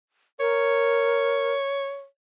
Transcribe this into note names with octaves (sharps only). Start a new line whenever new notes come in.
A#4 C#5